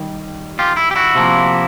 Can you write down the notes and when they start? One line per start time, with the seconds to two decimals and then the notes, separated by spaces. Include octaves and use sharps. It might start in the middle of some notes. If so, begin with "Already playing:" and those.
Already playing: D#3 G3
0.59 F4 G4
0.77 E4
0.91 G4
0.96 E4 F#4
1.15 C3 F3 A#3